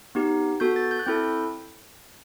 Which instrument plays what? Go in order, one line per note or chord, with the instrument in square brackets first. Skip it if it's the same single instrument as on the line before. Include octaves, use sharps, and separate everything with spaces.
[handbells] B3 D#4 G4
B3 F#4 A4 G6
A6
G6
F#6
C4 E4 A4 G6